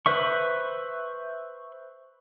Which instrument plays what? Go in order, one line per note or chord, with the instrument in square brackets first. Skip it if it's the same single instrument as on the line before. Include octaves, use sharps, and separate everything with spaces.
[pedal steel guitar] B4 C5 E5 C#6